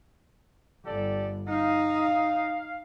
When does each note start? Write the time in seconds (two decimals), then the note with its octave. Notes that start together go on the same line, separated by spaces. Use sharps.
0.86 G1 G4 A4 D5
1.48 D#4 F5